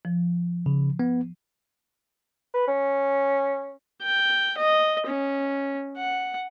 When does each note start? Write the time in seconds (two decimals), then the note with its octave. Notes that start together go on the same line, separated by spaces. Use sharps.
0.05 F3
0.66 C#3
0.99 B3
2.54 B4
2.68 C#4
4.02 G5
4.58 D#5
5.07 C#4
5.97 F#5